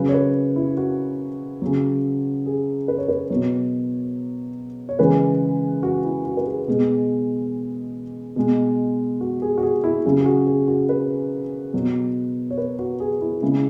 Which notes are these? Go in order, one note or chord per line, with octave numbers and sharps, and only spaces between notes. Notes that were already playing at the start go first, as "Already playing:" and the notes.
Already playing: C#3 F#3 B4
C#5
B4
E4
F#4
C#3 F#3
G#4
B4
C#5
B4
B2 F#3 C#5
C#5
C#3 E3 G#3 B4
F#4
E4
F#4
B4
G#4
B2 G#3 G#4
B2 G#3
F#4
G#4
F#4
G#4
E4
C#3 F#3 G#4
G#4
F#4
G#4
F#4
B4
B2 F#3
C#5
B4
F#4
G#4
E4
C#3 G#3 E4